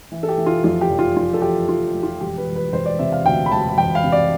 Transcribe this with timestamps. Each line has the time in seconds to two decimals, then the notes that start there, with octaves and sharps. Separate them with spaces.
0.12 E3
0.23 A4
0.29 G4
0.38 E3
0.46 F4
0.64 F2 F4
0.81 G4
0.90 F1
0.99 F4
1.16 F2 F4
1.34 A4
1.42 E3 G4
1.69 F1 F4
1.94 F2
2.03 F4
2.21 E1 G4
2.38 B4
2.47 E1
2.56 B4
2.73 E1 C5
2.86 D5
2.99 C3 E5
3.12 F5
3.25 D2 G5
3.46 B5
3.51 E1 A5
3.77 E1 G5
3.95 F5
4.04 C3
4.12 D5